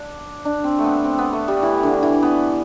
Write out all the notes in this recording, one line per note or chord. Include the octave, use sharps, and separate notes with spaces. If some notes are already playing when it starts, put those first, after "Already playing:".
Already playing: D4
D4
C4
A3
B3
C4
B3
A3
G3
E3
D3
E3
B3